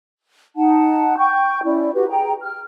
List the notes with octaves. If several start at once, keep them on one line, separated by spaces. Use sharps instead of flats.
D#4 F#5 A5
G5 C#6 G6
C#4 E4 D5
F#4 G4 B4
G#4 G5 A#5
F6